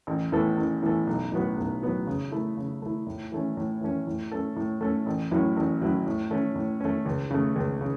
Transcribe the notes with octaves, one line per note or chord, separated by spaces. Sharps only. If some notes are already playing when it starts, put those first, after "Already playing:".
A1
A2 E3 B3 A4
A1
A2 E3 B3 A4
B1
A2 F#3 B3 F#4
B1
A2 F#3 B3 F#4
C#3
A3 E4
C#3
A3 E4
A2
E3 A3 C#4
A2
E3 A3 C#4
A2
A3 C#4 A4
A2
A3 C#4 A4
A1
A2 F#3 C#4 E4
A1
A2 F#3 C#4 E4
A2
A3 C#4
A2
A3 C#4
C#2
C#3 A3
C#2
C#3